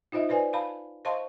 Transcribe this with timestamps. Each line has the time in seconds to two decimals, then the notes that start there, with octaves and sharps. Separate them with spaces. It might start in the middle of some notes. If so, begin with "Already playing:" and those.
0.12 D#4 F4 C5 D#5 E5
0.29 B4 C5 D5 G#5
0.53 F5 A5 B5
1.05 C5 D#5 F5 A5 C6 C#6